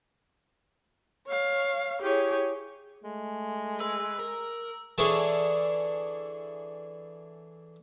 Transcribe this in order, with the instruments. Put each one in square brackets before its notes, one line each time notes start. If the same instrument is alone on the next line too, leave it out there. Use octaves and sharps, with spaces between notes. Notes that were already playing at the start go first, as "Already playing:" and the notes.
[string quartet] C#5 F5
E4 G4 G#4 C#5
[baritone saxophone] G#3 [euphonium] A3
[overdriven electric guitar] B4 [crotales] E6
[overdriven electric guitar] A#4
[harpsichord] D3 E3 D4 E4 G#4 C#5